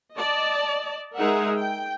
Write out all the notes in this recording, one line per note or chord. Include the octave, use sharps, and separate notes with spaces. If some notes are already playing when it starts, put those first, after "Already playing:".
D5 D#5 A5
G#3 D#4 G#4 A#4 E5 F#5
G5